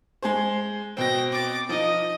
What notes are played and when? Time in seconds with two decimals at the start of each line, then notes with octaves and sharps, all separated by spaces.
0.23 G#3 G#4 C5
0.97 B2 C4 G5 A#6
1.32 D6 A6
1.69 F3 D#4 D#5